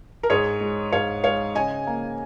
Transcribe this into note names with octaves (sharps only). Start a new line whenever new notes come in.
A#4
G#2 G#4 C#5
G#3
G#2 C#5 F5
G#3 C#5 F5
C#3 D#5 G#5
A#3